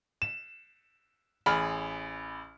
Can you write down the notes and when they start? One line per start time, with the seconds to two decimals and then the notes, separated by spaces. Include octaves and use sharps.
0.22 E7
1.46 A1 G#4 B5 F6